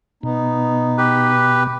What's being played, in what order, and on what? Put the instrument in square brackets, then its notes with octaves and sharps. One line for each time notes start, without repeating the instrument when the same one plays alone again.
[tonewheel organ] B2 [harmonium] B3 D#4
[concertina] G4 B4